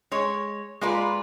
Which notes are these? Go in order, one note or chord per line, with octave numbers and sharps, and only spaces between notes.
G#3 C#5
G#3 A#3 F4 B4 D5